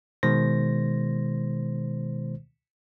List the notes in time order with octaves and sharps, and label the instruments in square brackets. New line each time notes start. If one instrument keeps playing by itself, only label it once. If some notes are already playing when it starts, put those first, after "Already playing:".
[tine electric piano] B2 D#3 G#3 C5 A#6